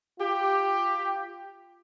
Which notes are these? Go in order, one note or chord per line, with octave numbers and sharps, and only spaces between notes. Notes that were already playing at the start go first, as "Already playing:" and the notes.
F4 G4